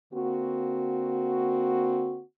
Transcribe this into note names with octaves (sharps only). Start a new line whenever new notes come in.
D3 A#3 C4 F#4